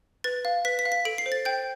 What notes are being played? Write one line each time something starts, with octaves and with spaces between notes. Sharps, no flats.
B4 A6
F5
B4 B6
B6
F5
B6
A4 D7
C7
C5
A6
G5 G6